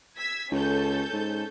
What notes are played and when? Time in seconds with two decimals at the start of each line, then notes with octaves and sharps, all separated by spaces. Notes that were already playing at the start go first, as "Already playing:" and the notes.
0.18 E6 G#6 B6
0.52 C#2 C#4 A4 G6
1.13 G#2